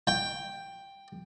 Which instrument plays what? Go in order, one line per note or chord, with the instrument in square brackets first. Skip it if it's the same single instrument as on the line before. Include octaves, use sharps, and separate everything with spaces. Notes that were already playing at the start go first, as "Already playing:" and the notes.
[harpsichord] G5